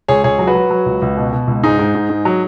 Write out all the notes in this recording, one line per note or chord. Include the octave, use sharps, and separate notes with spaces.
C#2 G#4 C#5
C#2 G#4 C#5
F#3
F#4 B4
F#3
F#3
C#2
C#2
B2
B2
C#2
G#2 D#4 G#4
G#2
G#2
G#2
F#3